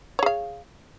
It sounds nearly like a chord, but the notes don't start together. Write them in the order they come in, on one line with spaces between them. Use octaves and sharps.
C#5 G#4 F5